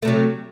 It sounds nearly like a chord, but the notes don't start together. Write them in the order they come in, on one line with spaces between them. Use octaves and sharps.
A3 C3 F#3